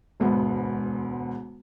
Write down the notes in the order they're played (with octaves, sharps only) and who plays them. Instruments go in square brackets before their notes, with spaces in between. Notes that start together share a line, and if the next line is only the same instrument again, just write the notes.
[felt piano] E1 D2 G#2 B3